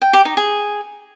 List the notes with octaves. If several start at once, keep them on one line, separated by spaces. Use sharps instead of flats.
G5
G4
D#4
G#4